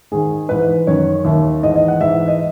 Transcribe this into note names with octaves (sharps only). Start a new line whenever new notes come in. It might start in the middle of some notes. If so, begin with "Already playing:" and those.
G#2 D#3 G#4
G#2 E3 B4
F#2 D#3 C#5
D#2 D#3 E5
G#2 E3 D#5
D#5
F#5
G#2 E3 E5
D#5